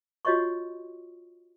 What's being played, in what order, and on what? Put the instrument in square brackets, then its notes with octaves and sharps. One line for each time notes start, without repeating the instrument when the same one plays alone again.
[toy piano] F4 F#4 C#5 D#5 C6 C#6